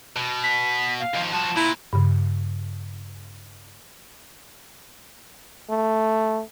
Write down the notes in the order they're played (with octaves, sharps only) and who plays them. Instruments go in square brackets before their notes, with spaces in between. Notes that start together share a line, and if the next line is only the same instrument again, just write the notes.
[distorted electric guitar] B2
[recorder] B6
F5
[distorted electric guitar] D#2 F3
[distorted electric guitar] F3 F#4 [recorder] A5
[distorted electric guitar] A#2 [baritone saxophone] E4
[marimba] G2 C#3
[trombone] A3